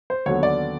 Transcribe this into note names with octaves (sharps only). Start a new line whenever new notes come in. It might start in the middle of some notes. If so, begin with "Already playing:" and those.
C5
D#2 D3 F#3 B3 C#5
D5